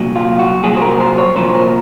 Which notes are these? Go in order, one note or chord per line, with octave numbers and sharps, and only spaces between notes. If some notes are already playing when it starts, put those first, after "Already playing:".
Already playing: C2 A#2 F#3
F4
F#4
C2 A#2 F#3 G#4
C5
A#4
C5
C#5
C2 A#2 F3 C5
A#4